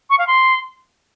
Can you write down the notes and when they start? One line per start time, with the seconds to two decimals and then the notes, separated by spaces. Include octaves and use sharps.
0.10 C#6
0.19 F5
0.27 C6